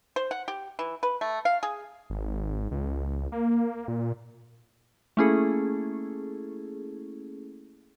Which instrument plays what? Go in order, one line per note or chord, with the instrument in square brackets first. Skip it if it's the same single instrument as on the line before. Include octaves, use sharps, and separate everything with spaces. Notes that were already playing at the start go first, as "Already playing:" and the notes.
[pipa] C5
F#5
G4
E3
B4
A3
F5
G#4
[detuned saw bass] G#1
C#2
A#3
A#2
[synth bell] A3 A#3 C#4 E4 G#4 A4